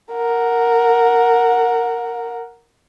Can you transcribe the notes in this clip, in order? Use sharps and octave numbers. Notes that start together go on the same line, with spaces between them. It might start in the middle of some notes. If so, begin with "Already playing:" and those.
A#4 F#5